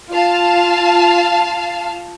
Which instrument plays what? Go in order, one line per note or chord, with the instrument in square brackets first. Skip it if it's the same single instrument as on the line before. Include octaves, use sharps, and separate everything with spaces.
[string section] F4 F5 A5